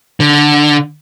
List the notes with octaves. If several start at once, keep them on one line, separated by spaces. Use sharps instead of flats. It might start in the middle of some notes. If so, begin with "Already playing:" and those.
D3